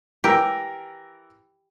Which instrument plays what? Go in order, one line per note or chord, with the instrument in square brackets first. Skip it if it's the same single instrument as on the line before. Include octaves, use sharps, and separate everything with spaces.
[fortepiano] E3 A#4 E6 [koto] G4